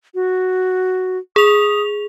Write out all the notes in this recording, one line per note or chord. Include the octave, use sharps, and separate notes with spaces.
F#4
G#4 D#6 F7